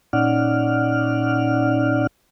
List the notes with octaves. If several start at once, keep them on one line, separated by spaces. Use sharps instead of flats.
A#2 C#4 D#4 D5 F#5 F6